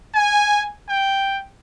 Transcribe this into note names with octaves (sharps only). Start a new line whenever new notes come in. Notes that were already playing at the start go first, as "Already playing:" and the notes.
G#5
G5